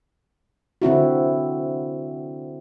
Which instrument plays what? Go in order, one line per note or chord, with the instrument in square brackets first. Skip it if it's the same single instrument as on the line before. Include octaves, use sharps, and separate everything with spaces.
[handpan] D3 C4 E4 F#4